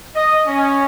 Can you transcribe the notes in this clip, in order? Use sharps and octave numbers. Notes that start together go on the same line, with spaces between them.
D#5
C#4